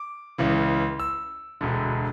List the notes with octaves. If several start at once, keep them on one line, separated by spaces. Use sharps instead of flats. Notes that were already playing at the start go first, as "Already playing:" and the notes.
Already playing: D6
C#2 C#3 E3
E6
E1 D2 D3